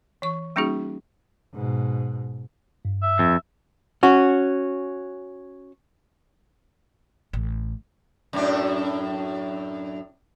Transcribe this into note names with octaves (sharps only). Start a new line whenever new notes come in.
E3 C#6
G3 A#3 C#4 D#4 F#4 G#4
G#2 B2
G2
E5
F2
C#4 F#4
A1
F#2 A2 D4